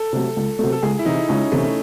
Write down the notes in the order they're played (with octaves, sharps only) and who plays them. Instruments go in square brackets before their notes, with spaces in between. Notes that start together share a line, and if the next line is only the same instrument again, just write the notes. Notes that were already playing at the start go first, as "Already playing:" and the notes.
Already playing: [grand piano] A4
[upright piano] C3 F#3 A3
C#2
C3 F#3 A3
[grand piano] A4
[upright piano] C#2 [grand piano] G#4
[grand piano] E4
[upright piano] C3 E3 [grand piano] D#4
[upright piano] C#2 [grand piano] C#4
[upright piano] C3 E3 [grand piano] A3